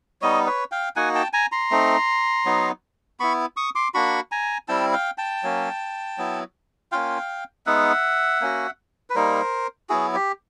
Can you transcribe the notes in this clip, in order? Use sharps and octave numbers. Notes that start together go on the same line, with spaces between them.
G3 B3 D#4 C#5 D#5
B4 C#5
F5 G5
A#3 D#4 F#4 F#5 G#5
G5 A5
G#5 A#5
A#5 C6
A3 C4 D#4
F#3 B3 D#4
B3 E4 B5 C#6
C#6 D#6
C6 D6
A#3 D4 F#4 B5 C#6
G#5 A#5
G3 C4 E4 G5 A5
F5 G5
G5 A5
F#3 A#3 C#4
F#3 B3 E4
A#3 C#4 F4 F5 G5
G#3 B3 D#4 E5 F#5
A#3 C#4 F#4
B4
G3 A#3 D#4 A#4 C5
F#3 B3 E4 F#4 G#4
G4